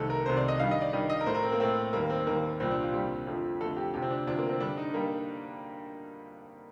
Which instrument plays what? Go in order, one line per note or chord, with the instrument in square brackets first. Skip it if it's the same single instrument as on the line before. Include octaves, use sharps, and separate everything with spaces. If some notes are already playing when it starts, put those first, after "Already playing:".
Already playing: [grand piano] C2 C3 D#3 A3 A4
A#4
C2 C3 D#3 A3 C5
D5
D#5
G2 D#3 G3 F5
D#5
D5
G2 D#3 G3 D#5
D#5
A#4
A2 A3 C5
A#4
C4
A#3
A2 A3 C4
D#2 D#3 G3 A#3
C4
D#2 D#3 G3 A#3
C2 A#2 G3 C4
D4
F4
C2 A#2 G3 G4
F2 D3 F3 A3
F2 D3 F3 A3 A4
G4
D2 C3 F3 G4
C4
D4
D2 C3 F3 D4
A#3
C4
G2 D3 G3 D4
D#4
D3 G3 A#3